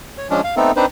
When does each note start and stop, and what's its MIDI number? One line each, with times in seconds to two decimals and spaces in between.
0.18 0.27 73
0.30 0.41 53
0.30 0.41 56
0.30 0.41 61
0.30 0.41 62
0.44 0.55 77
0.57 0.72 57
0.57 0.72 59
0.57 0.72 60
0.57 0.72 63
0.57 0.72 69
0.76 0.86 60
0.76 0.86 62
0.76 0.86 63
0.76 0.86 71
0.76 0.86 72